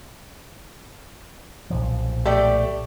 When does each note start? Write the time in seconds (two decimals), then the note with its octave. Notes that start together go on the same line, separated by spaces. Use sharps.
1.70 B1 A#2 F3
2.25 A3 G4 D5